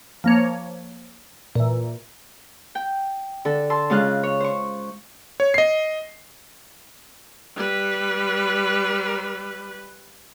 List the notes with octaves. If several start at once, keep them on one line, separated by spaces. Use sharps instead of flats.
F3 A#3 C#5
A#2 E3
G5
D3 A4
A5 C6 E6
C#3 G#3 F4 D#5 F#6
C#5
C5 C#6
C#5
D#5 C7
G3 B4